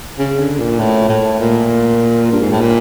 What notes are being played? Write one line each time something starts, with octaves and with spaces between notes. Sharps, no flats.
C#3
D3
A#2
A2
A2
A#2
G2
G#2
A2
A#2